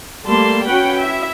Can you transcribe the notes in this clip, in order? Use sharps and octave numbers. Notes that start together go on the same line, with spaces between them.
G3 A3 A#3 A5 C6
C#4 F#4 B4 F#5 G5
E4 E5